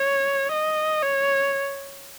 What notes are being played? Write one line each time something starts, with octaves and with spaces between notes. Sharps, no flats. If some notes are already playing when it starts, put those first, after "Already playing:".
Already playing: C#5
D#5
C#5